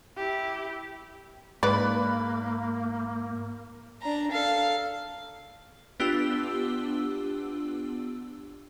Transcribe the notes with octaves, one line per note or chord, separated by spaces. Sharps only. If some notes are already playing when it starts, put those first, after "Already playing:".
E4 G4
G#2 A#3 B4 D5 B5 F#6
D4 A#5
A4 F5
B3 D4 F4 G4 E6 G7